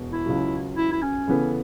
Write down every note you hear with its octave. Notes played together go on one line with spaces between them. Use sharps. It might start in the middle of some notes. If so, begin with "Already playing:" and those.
Already playing: E1 B2
E4
C#2 C#3 F#3
E4
E4
C#4
C#3 E3 B3 A4